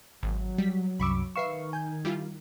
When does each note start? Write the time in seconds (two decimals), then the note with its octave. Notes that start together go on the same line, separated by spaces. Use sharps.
0.23 G#1 F#3
0.58 G3 B6
1.00 C2 F#2 B5 C#6 D6 E6
1.36 D#3 B4 E5 F5 C#6 C7 E7
1.73 G#5 G6
2.05 G3 E4 F4